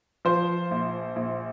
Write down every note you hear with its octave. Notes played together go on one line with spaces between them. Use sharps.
F3 C5
A#1
A#1